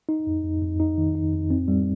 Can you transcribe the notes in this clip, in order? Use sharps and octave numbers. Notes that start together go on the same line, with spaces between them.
D#4
F2
F2
F2
D#4
D#3
D#4
F2
C4
G3